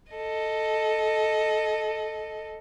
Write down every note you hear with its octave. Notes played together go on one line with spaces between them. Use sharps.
A4 D#5